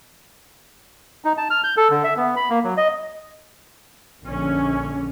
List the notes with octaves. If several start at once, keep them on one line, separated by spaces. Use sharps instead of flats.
D#4
A5
F6
G6
A4
D3
E5
B3
B5
A#3
F#3
D#5
A#1 D3 C#4